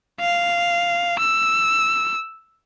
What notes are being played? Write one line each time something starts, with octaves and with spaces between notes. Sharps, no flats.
F5
E6